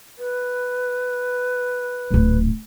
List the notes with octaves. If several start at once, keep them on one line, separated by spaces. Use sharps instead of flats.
B4
D1 A#1